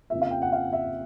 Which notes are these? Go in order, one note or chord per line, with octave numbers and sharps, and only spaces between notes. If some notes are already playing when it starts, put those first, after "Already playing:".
F2 C#3 F3 A#3 E5
F5
G5
F#5
F5
E5